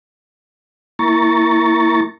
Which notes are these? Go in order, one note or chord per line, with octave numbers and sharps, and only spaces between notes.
A#3 E4 A#5 C#6 A6